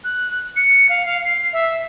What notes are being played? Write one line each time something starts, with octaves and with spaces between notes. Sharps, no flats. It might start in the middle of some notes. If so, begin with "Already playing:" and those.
F#6
C#7
F5
F5
C7
E5